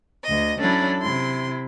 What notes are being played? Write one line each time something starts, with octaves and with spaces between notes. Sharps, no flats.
D2 D#5
F#3 C#4 D4 E4 A4
C3 E4 C6